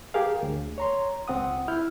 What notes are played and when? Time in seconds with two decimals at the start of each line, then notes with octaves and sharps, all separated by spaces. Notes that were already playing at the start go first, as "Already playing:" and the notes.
0.14 G4 G#4 A#4 F5
0.43 D2
0.78 C#5 A#5 C6
1.28 C#2 C4 F#5 D#6
1.68 E4 F6 G6